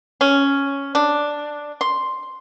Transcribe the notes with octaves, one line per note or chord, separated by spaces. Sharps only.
C#4
D4
C6